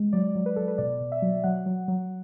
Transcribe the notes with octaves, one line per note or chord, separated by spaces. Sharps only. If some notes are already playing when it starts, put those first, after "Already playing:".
Already playing: G#3
F#3 D5
F#3
B4
F#3 A4
B4
B2 D5
B2
E5
F#3
F#3 F#5
F#3
F#3